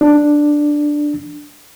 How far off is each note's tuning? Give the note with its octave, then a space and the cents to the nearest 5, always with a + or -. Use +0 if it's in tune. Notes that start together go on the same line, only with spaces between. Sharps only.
D4 +5